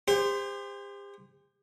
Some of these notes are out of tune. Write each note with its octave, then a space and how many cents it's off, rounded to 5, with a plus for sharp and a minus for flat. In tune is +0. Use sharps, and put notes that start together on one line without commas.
G4 +40 C5 -10